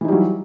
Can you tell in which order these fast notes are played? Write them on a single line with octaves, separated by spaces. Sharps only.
E3 D#4 G3 F#3